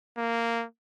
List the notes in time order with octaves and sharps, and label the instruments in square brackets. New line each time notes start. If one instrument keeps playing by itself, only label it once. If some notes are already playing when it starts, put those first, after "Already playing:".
[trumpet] A#3